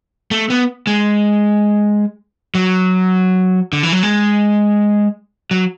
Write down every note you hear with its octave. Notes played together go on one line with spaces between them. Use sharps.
A3
B3
G#3
F#3
D3
E3
F#3
G#3
F#3